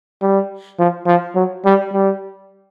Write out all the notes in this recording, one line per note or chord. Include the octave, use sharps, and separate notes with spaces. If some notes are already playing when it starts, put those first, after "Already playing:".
G3
F3
F3
F#3
G3
G3